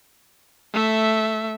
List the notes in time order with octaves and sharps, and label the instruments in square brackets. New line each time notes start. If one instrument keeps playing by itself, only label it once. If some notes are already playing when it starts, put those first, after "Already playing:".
[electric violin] A3 E5